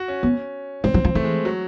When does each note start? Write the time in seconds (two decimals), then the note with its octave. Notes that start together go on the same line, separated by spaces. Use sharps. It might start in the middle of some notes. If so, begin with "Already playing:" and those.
Already playing: F#4
0.08 C#4
0.23 B3
0.84 G3 C4
0.94 F#3
1.04 F3
1.15 E3 A3
1.24 G#3
1.45 F#3